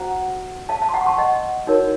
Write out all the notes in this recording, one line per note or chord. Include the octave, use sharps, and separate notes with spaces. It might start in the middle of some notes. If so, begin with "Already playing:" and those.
Already playing: F#4 C5 F#5 A#5
F5 A5
F5 A5
C6
F#5 A#5
C#6
A5 C6
D#5 F#5
D#4 F#4 A#4 C#5